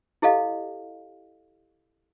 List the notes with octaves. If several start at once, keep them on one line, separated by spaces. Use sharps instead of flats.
E4 G4 A4 D#5 F5